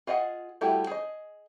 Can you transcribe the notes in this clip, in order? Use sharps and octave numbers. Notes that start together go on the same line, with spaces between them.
F4 G#4 D#5 E5 F#5
G3 A3 E4 F#4 G4
G#4 D#5